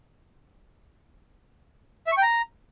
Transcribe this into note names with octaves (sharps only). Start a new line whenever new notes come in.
E5
C#6
G5
A#5